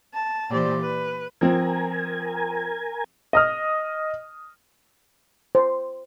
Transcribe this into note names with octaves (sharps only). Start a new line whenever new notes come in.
A5
A#2 E3 G4 C5 D5
B4
F3 C4 A#4 G#5
D#5 D#6 F6
C5